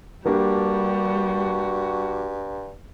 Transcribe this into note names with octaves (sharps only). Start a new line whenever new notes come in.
G2 G3 A#3 D4 F#4 G4